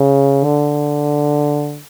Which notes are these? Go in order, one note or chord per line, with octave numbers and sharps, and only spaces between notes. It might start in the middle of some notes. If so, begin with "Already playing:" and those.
Already playing: C#3
D3